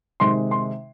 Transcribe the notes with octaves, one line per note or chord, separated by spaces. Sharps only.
C3 D#3 G#3 C6
C6